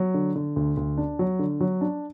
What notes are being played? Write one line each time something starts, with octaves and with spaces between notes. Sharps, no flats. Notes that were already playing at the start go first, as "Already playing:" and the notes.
Already playing: F#3
D3
D3
D2
D2
D4
F#3
D3
F#3
D4